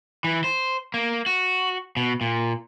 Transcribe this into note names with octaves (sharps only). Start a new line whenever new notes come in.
E3
C5
A#3
F#4
B2
A#2